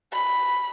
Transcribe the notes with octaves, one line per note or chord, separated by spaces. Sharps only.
B5